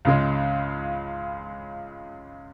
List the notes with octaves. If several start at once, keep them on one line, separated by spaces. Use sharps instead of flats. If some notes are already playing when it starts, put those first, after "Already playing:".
C#2 C#3 G#3